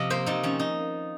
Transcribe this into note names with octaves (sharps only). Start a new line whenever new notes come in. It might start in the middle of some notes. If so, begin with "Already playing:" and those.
Already playing: C3 F3 D#5 F5
A#3 C5
C3 D#4
F3 C#4
D#4